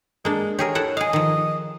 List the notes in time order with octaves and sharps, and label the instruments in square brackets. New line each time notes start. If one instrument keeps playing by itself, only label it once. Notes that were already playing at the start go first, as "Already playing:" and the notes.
[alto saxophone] G#3 [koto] A#3 D4
[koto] G4 G#4 A#4 [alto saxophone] C#5
[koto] E4 A4 F#5
[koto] G#4 F5 [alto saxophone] D#5
[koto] D#3 F3